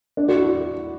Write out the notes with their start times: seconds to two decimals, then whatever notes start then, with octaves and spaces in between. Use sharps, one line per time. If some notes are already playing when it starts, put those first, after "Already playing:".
0.17 D4
0.28 F#4
0.35 E4